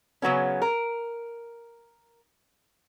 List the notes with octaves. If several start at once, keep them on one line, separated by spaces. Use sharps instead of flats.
C#3 F#3 B3 C#4
A#4